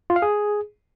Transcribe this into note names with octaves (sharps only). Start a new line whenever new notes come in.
F4
F5
G#4